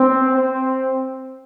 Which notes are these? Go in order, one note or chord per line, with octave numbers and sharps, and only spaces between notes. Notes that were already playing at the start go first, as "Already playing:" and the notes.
Already playing: C4
C4